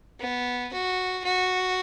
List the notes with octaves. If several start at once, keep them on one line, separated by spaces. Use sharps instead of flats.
B3
F#4
F#4